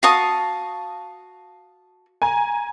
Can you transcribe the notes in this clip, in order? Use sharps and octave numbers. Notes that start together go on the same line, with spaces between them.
F#4 F5 A5 C#6 D#6
G#5 A#5